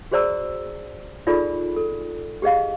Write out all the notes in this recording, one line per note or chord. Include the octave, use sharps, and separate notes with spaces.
F#4 G#4 C5 D5 A#5 E6
D#4 F4 G#4 A4 D5 B5
A4
G4 G#4 D#5 F5